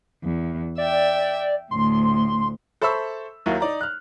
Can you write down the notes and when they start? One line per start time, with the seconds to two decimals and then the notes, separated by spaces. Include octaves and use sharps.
0.23 E2
0.78 D5 E5 G5
1.71 D2 A2 C6
2.82 A4 C5 E5 B5 C#6 E6
3.46 D#2 D#3 F#3 E4 F5
3.60 D#4 D5 A#5
3.81 F6 F#6